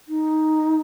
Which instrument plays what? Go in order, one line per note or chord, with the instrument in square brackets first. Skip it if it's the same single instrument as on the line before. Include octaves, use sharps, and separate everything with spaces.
[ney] D#4